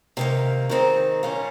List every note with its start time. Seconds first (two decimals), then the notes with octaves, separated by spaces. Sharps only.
0.17 C3 D#3 A#3
0.70 D#3 G#3 C4 D#4
1.23 A#2 G3 C#4 F4